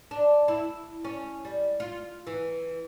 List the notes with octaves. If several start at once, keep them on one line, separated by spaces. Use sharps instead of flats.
D4
E4
C#4
G3
F4
E3